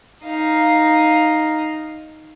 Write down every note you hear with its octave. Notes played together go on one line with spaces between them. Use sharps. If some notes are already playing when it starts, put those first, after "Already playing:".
D#4 F5